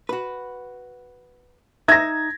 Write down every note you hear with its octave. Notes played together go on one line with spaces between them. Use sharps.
F#4 B4
D#4 E5 A#5 G#6 A#6